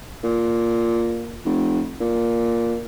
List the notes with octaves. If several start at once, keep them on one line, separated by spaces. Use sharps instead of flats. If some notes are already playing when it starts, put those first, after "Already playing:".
A#2
F1
A#2